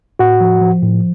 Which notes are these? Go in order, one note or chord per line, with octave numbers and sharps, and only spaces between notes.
A2 F#4 F#5
F3
F3
A2